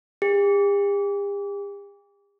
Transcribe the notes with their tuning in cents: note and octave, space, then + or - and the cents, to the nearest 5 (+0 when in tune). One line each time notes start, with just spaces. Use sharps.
G4 +45